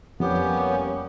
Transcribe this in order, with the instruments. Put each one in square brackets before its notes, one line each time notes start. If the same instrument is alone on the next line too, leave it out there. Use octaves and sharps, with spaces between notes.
[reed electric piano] F2 [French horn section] G3 A#3 C#4 [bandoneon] B3 [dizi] G4